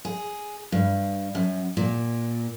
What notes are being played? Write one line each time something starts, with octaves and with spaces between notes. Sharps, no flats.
G#4
G2
F#2
A#2